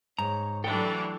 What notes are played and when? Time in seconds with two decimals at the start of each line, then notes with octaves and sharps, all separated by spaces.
0.19 G#2 C#5 A#5
0.64 E3 F#3 G3 A3 D4 A4 F#5 G5